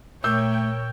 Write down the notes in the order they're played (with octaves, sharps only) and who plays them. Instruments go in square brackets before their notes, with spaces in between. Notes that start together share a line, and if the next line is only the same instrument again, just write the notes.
[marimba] A#2 [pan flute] A3 [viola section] A#4 C#5 G5 [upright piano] E6 G6